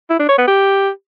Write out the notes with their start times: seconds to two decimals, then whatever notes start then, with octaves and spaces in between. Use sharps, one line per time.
0.10 E4
0.19 D4
0.29 C#5
0.38 B3
0.47 G4